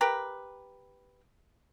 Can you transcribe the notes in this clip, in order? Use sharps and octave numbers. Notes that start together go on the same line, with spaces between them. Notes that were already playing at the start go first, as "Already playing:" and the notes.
G4 A#4 B4